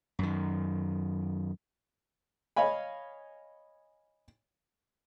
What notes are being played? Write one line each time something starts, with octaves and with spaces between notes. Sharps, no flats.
F#2 D#3
C#5 D#5 F5 G#5 B5